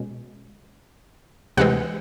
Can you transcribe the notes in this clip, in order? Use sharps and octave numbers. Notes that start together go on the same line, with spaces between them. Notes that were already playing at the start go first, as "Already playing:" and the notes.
Already playing: B2 G#3 C#4
D2 C3 E3 G#3 C4 F#5